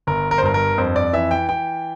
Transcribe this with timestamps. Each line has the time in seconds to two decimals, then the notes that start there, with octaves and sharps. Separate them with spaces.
0.07 G1 A#4
0.31 A#4
0.38 C5
0.42 G2 A#4
0.54 A#4
0.78 F2 C5
0.96 D5
1.13 E3 E5
1.31 G5
1.49 E3 G5